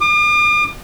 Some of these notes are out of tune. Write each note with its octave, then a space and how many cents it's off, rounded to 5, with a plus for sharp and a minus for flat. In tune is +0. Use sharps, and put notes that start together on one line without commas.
D6 +45